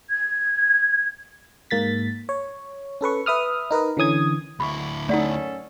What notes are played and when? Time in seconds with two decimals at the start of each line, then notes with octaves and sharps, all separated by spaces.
0.10 G#6
1.71 G#2 A#3 A6 B6
2.29 C#5
3.01 C#4 A4 B4 C#6
3.26 B4 E5 D#6 F6
3.71 D#4 A#4 B4 D#5
3.97 D3 E3 C#4 D#6 G#6
4.60 D2 E4 B5 C#6
5.09 F#2 A3 C#4 D#4 A4 D5 F#5 D#6